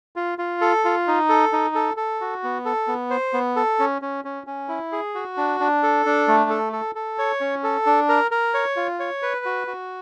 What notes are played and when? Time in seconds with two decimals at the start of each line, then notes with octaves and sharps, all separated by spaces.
0.16 F4
0.38 F4
0.61 A4
0.85 F4
1.08 D#4
1.29 A4
1.53 D#4
1.75 A4
1.97 A4
2.21 F#4
2.43 B3
2.65 A4
2.88 B3
3.10 C5
3.33 B3
3.56 A4
3.79 C#4
4.02 C#4
4.25 C#4
4.47 C#4
4.69 E4
4.92 G#4
5.15 F#4
5.37 D4
5.60 D4
5.83 A4
6.06 D4
6.28 A3
6.50 A4
6.73 A4
6.95 A4
7.18 C#5
7.40 C#4
7.64 A4
7.86 D4
8.09 A#4
8.31 A#4
8.54 C#5
8.76 F4
9.00 C#5
9.22 B4
9.45 F#4
9.67 F#4